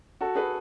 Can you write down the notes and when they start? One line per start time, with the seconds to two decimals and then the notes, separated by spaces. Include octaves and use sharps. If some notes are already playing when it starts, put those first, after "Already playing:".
0.21 F#4 A4
0.35 G#4 B4